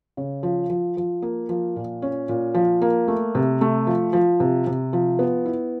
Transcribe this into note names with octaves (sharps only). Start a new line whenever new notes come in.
C#3
F3
F3
F3
A#3
F3
A#2
C#4
A#2
F3
A#3
A3
C3
A3
F3
F3
C3
C3
F3
B3
E4